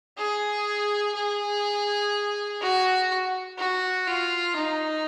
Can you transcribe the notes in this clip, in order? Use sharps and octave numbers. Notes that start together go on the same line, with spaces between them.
G#4
G#4
F#4
F#4
F4
D#4